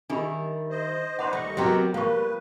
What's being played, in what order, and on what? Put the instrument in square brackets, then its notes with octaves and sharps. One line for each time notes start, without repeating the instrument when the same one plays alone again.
[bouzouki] D#3 G3 E4 [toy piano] D4 G4 B5
[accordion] C5 D#5
[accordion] D#4 B4 C5 [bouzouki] D5 [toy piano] F#5 B5 C6
[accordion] D#2 D#5 C#6 [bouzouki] G3 A3
[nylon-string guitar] F#3 G4 [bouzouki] B3 C4 A#4 [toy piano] C6
[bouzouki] F3 G3 [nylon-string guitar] A#3 [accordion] B4 [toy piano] F5 C#6